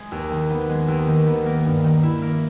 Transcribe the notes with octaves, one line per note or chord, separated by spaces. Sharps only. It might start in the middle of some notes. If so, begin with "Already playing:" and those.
Already playing: G#3
D#2
D#3
B3
G#3
D#2
D#3
B3
A#3
G2
D#3
E4
A#3